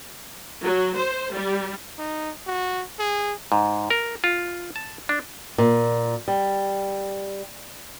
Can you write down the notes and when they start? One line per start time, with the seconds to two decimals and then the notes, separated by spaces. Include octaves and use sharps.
0.64 F#3
0.97 C5
1.33 G3
1.98 D#4
2.47 F#4
2.99 G#4
3.52 G#2
3.90 A#4
4.24 F4
4.76 A5
5.09 D4
5.58 A#2
6.28 G3